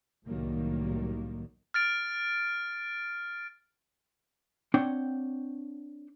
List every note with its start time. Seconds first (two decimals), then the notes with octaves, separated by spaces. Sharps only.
0.27 C2 A2 D#3 F#3 G3 A#3
1.74 F6 A6 D7
4.74 C4 D4 C#5 F#5 G5